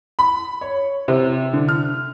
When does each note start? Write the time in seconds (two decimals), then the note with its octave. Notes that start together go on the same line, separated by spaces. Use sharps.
0.19 B5
0.61 C#5
1.08 C3
1.53 D3
1.69 F6